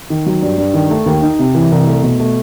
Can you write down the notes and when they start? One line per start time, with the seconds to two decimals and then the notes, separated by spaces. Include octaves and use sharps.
0.10 D#3
0.26 F#3
0.42 G2
0.58 G2
0.74 D#3
0.90 A3
1.06 D#2
1.22 D#4
1.39 C3
1.55 E3
1.72 C2
1.87 A3
2.03 B2
2.20 A3